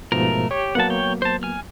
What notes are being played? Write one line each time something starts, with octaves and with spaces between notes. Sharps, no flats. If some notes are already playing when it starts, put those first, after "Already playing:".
G#2 B2 F3 A3 A#4
G4 C#5
F#3 A#3 B3 F#5 A5
C#5 G5
C5 A5
G#5 F6